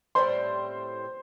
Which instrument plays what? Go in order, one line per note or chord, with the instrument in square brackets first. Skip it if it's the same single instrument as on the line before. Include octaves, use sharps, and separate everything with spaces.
[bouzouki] A2 G3 C4 [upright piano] C5 C6